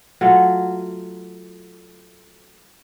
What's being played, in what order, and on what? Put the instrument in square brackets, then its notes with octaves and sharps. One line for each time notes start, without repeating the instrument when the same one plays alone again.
[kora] F#3 A3 F4